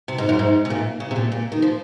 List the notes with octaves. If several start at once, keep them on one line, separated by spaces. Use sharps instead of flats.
C3
G#2
F#2
G#2
C3
A#2
C#3
C3
A#2
A#2
D#3
F3